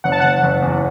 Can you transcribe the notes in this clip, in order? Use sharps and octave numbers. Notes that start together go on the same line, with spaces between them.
F#1 F#5
A5
F#1 F#5
F#1
E2